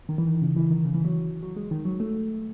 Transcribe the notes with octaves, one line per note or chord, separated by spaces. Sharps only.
D#3
E3
D#3
C#3
E3
D#3
C#3
E3
F#3
F#3
G#3
D#3
F#3
A3